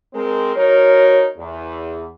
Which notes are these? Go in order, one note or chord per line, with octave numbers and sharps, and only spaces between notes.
G#3 C4 A#4
F#3 D#4 F#4 A#4 C#5
E2